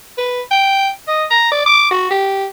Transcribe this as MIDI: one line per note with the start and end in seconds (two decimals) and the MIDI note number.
0.18 0.41 71
0.51 0.90 79
1.08 1.24 75
1.31 1.48 82
1.52 1.63 74
1.66 1.87 86
1.91 2.09 66
2.10 2.46 67